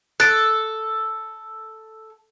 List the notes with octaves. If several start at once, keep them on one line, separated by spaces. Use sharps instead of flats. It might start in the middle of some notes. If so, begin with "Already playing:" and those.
A4 F#6 A6 D7